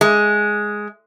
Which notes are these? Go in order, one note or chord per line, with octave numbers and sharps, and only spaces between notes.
G#3